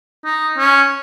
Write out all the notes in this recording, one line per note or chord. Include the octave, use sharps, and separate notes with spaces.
D#4
C#4